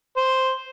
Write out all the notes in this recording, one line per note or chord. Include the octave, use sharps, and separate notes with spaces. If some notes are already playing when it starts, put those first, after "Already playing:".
C5